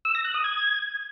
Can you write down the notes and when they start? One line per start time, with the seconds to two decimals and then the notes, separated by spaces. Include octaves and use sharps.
0.05 E6
0.15 A#6
0.25 F#6
0.34 D#6
0.44 G#6